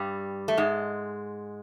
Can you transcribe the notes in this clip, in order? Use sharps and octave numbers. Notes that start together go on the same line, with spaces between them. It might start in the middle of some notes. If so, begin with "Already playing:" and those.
Already playing: G2 G3
A3
G#2 G#3